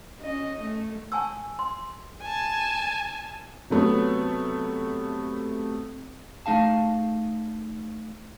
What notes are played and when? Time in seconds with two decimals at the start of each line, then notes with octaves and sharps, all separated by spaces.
0.20 C#4 D#5
0.61 A3
1.12 G#5 A5 C#6 E6
1.59 C6
2.22 G#5 A5
3.70 C3 F#3 A3 B3
6.46 A3 D#4 G#4 F5 A5